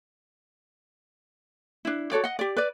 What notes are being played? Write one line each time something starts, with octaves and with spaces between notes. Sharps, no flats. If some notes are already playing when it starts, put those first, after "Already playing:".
D4 E4
F#4 A4 C#5 D5
D#5 F#5
G4 D5
B4 D5